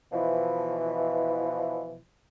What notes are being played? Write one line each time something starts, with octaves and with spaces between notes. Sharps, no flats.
B2 E3 F3